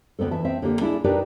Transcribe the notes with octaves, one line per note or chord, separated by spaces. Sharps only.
D2 C3 B3 C4 A4
E3 E5 A5
C4 E5
D3 A#3 G4
D4 E4 G#4
D4 D#4 G4 A#4 B4 D5